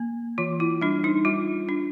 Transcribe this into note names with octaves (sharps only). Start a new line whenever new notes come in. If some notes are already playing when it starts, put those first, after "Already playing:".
Already playing: A#3
E3 F4
E4
G3 D4
D#4
G3 F4
D4